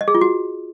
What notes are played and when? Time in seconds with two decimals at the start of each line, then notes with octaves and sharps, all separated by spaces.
0.01 D#5
0.08 G#4
0.15 F4
0.21 F#4